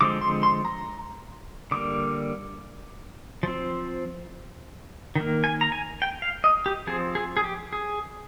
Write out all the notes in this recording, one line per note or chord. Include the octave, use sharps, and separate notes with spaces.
D3 F3 G#3 C4 D6
C6
C6
A#5
D3 G3 A#3 D6
F3 C4
D#3 A#3
G#5
A#5
G#5
G5
F5
D#5
G4
F3 C4 G#4
G#4
G#4
G4
G#4